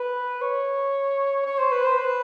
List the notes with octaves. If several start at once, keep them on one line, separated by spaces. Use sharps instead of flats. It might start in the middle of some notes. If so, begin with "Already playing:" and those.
Already playing: B4
C#5
C#5
C5
B4
C5
B4